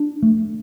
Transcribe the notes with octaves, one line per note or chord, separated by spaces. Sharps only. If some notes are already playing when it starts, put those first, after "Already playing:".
Already playing: D4
A3